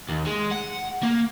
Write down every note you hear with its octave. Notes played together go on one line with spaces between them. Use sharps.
D#2
G#3
F#5
A#3